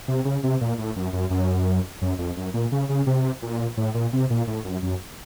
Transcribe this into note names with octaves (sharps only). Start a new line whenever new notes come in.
C3
C#3
C3
A#2
A2
F#2
F#2
F#2
F#2
F2
F#2
A#2
C#3
C#3
C3
A#2
A2
A#2
C3
A#2
A2
F#2
F#2